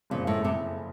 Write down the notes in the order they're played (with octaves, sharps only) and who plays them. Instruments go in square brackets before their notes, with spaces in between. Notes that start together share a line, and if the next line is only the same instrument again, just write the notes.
[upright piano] F#1 F2 C#3 F3 [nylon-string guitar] A#2
[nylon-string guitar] A2
C3